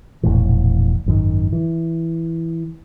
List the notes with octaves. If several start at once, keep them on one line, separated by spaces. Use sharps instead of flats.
E1 A#1 A2 E3
G#1 F#2 D#3
E3